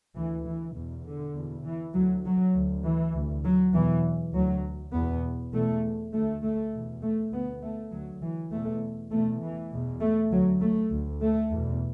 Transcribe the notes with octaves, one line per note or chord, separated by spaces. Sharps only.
D2 E3
E3
E2 B2
D3
E2 B2
E3
D2 F#3
F#3
D2
E3
D2
F#3
E2 B2 E3
D2 F#3
E2 B2 B3
E2 B2 A3
D2 A3
A3
E2 B2
A3
D2 B3
A3
D2 F#3
E3
E2 B2 A3
E2 B2 A3
E3
E2 B2
A3
D2 F#3
A3
D2
A3
E2 B2